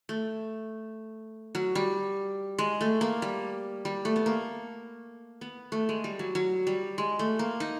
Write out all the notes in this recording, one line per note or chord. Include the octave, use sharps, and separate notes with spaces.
A3
F#3
G3
G#3
A3
A#3
G3
G3
A3
B3
A#3
B3
A3
G#3
G3
F#3
F#3
G3
G#3
A3
A#3
D#4